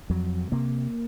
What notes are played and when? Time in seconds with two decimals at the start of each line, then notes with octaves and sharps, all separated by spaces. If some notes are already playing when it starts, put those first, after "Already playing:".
0.10 F2 F#3
0.52 C3 A#3